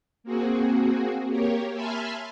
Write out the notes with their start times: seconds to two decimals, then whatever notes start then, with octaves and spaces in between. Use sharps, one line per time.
0.24 A#3 C4 F#4 G#4
1.29 A#3 G4 A#4 C#5
1.73 E5 G#5 A5 B5 C6 F6